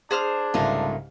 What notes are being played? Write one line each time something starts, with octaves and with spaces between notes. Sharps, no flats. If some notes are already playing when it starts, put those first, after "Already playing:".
D4 G#4 C5 F6
C2 G#2 C#3 A3 A#3 F4